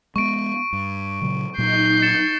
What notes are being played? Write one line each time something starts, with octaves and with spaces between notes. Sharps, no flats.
G#3 A3 B3 C#6 D7
G2
A#2 C#3 F#3
A#2 F#3 D#4 G6 C7
A6 C#7 E7